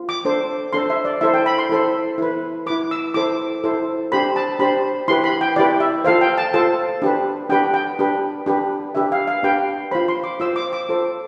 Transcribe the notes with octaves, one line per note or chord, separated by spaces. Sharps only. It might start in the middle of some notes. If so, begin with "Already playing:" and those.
Already playing: F4
D6
D4 A4 C5
D4 A4 C5 C6
E5
D5
E4 A4 C5 E5
G5
B5
C6
E4 A4 C5
E4 B4
E4 B4 D6
E6
E4 A4 C5 D6
E4 A4 C5
D4 G4 C5 B5
A5
D4 G4 C5 B5
E4 G4 B4 C6
B5
G5
E4 G4 B4 D5
E5
F4 A4 C5 F5
G5
A5
F4 A4 C5 A5
D4 G4 B4
D4 G4 B4 G5
G5
D4 G4 B4
D4 G4 B4
D4 G4 B4 E5
F5
F5
D4 G4 B4 G5
F4 C5 B5
C6
D6
F4 C5 E6
D6
D6
F4 A4 C5